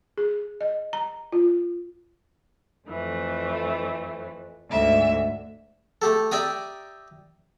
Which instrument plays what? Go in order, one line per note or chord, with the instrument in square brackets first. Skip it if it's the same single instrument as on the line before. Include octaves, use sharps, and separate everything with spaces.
[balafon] G#4
D#5
A#5
F4
[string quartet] F2 E3 A3
D2 G#2 E5 E6
[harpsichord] A3 G4 A4
G4 D5 E5 G5 A#5 D#6